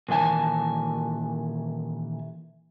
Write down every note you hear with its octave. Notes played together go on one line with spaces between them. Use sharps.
A#2 D#3 E3 G#5 A5